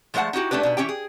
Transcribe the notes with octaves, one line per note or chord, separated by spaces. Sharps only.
F3 G#3 A3 A#4 F#5 A5
D#4 E4 F#4 G4
A3 C#4 D4 G4 B4
B2 D#4 B4
E3 F#3 C#4 G4 G5
G#4